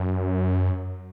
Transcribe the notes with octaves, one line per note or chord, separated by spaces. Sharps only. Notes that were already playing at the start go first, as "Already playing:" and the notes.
Already playing: F#2